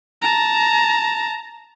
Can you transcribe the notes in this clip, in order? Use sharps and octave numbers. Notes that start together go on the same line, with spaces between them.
A5 A#5